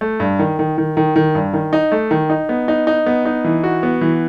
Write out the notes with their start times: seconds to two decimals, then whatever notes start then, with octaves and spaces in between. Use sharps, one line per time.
0.01 A3
0.20 G2
0.39 D#3
0.59 D#3
0.78 D#3
0.97 D#3
1.16 D#3
1.35 G2
1.53 D#3
1.73 D#4
1.92 A3
2.11 D#3
2.30 D#4
2.49 B3
2.68 D#4
2.87 D#4
3.06 B3
3.25 D#4
3.44 E3
3.63 F#4
3.83 B3
4.01 E3